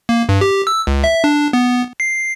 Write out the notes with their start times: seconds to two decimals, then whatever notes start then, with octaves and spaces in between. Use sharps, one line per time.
0.09 A#3
0.29 G2
0.41 G4
0.67 E6
0.87 C#2
1.04 E5
1.24 D4
1.53 B3
2.00 C7